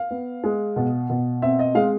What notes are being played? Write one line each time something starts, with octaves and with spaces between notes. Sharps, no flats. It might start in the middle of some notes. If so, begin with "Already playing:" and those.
Already playing: F5
B3
G#3
B2
B2
C4 E5
D#5
G#3 F5